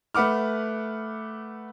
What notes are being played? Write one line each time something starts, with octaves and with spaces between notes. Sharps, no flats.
A3 B4 F#5 D6 F6